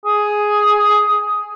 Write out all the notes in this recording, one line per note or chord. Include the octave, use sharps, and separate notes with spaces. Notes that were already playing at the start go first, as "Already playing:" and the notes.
G#4